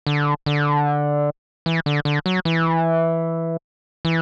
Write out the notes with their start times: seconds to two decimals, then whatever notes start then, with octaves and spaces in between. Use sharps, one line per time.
0.07 D3
0.46 D3
1.66 E3
1.86 D3
2.05 D3
2.26 F#3
2.45 E3
4.05 E3